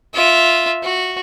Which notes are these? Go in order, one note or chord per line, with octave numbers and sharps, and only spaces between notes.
F4 E5
F#4